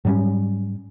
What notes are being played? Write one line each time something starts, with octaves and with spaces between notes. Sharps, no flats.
G#2 F#3 G3 C#4